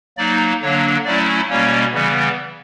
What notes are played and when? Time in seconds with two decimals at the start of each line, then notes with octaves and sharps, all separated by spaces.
0.17 F#3 A#3 D#4 D5
0.61 D3 F#3 A#3 D4 C#5
1.05 F#3 A3 C#4 E4 D5
1.50 B2 G3 A#3 C#4 C#5
1.93 C#3 E3 G3 B3